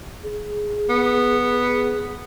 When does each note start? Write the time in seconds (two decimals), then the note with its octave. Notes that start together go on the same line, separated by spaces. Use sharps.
0.23 G#4
0.89 B3